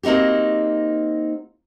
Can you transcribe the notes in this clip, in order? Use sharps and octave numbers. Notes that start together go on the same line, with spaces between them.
A#3 C4 D#4 F#4 G4